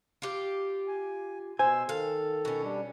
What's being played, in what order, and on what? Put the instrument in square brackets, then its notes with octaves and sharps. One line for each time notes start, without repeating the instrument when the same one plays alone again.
[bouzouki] F4 G4
[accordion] G#5
[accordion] B2 C6 E6 [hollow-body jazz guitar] C5 G#5
[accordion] D#3 A4 [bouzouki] F5
[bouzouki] B2 C#4
[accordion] G3 D4